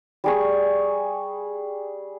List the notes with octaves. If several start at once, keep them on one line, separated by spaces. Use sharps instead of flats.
G3 G#4 C#6